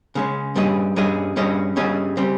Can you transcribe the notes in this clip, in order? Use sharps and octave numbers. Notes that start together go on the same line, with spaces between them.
C#3 G#3 C#4
G2 G3 C#4 G#4 D#5
G2 G3 C#4 G#4 D#5
G2 G3 C#4 G#4 D#5
G2 G3 C#4 G#4 D#5
C#3 G3 C4